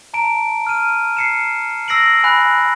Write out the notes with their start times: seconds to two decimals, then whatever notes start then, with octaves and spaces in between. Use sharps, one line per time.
0.14 A5 A#5 D7
0.67 F6 D#7
1.17 C7 C#7 E7
1.88 E6 A#6 C7 D7 F#7
2.24 G#5 B5 F#6